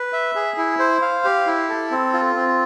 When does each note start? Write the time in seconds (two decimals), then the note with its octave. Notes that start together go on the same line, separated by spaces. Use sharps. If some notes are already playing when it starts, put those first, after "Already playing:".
Already playing: B4
0.13 E5
0.35 G#4
0.58 E4
0.79 C5
1.02 F5
1.25 G4
1.47 E4
1.69 A4
1.91 C4
2.13 F4
2.35 C4